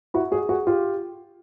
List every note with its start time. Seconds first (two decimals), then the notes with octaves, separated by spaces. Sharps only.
0.14 E4 F#4
0.32 F#4 G#4
0.49 F#4 G#4
0.67 F4 G4